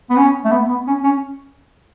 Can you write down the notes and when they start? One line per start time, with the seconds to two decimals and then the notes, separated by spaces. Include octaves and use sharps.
0.10 B3
0.17 C#4
0.45 A3
0.52 B3
0.68 B3
0.87 C#4
1.04 C#4